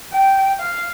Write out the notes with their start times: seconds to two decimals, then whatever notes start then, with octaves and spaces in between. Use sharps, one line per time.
0.13 G5
0.59 F5